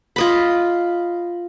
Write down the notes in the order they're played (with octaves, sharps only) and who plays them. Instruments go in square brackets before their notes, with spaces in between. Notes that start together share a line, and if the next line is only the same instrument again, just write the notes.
[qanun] F4 D#5 B5